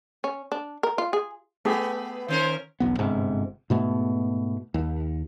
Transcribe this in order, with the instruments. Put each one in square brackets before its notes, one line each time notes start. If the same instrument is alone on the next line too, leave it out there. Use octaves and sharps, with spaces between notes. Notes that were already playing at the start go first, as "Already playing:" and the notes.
[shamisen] C#4
D4
A#4
F4
G#4
[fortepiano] A3 G4 G#4 [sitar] B3
[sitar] D#3 C#4 A#4 [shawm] C5
[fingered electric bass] E1 B1 B3
G1 G#2 C3
G#2 B2 A3 B3
D#2